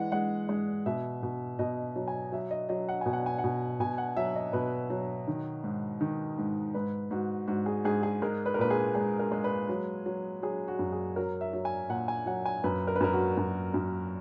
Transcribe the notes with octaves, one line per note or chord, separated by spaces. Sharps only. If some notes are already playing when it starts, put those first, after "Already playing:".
Already playing: E3 G#3 D#5 F#5
G#3 F#5
G#3
B2 E5
B2
B2 D#5
F#3
G#5
F#3 E5
D#5
F#3 D#5
F#5
B2 G#5
F#5
G#5
F#5
B2
B2 G#5
F#5
F#3 E5
D#5
B2 B4
F#3
D#3
G#2
D#3
G#2
G#2 B4
G#2 F#4
G#2 F#4
G#4
G#2 G#4
G#4
G#3 A#4
B4
A#4
A#2 B4
G#4
G#3 G#4
A#4
G#3
B4
F#3
F#3
F#3 G#4
F#4
F#2
G#4
F#3 A#4
E5
F#3
G#5
A#2 F#5
G#5
F#3 F#5
G#5
F#2 B4
A#4
B4
F#2 A#4
F#4
F#2
F#2